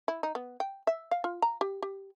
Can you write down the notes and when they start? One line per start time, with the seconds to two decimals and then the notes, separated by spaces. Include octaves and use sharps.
0.08 E4
0.23 D#4
0.35 B3
0.60 G5
0.87 E5
1.11 F5
1.24 F4
1.42 A#5
1.61 G4
1.82 G4